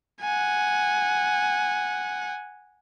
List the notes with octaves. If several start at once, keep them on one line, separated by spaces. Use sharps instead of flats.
F#5 G#5